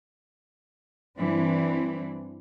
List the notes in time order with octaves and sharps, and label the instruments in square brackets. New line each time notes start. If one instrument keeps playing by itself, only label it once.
[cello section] G2 E3 C4 D4